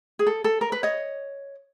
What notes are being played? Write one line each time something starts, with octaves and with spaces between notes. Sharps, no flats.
G#4
A4
A4
A#4
B4
C#5 D#5